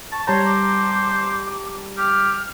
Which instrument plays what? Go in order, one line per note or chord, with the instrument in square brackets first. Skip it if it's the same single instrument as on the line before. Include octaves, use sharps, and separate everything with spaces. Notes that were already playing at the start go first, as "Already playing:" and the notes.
[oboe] A5 [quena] C#6
[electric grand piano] G3 A5 A#5 [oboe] C5 [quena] C#5
[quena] D6
[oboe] G4 [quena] F6